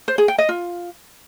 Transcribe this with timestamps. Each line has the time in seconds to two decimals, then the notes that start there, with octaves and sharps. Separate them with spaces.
0.08 C5
0.18 G#4
0.28 G5
0.38 D#5
0.49 F4